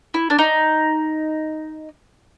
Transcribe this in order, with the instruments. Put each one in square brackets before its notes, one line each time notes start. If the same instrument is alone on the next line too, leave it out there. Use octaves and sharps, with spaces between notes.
[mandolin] E4
D4
D#4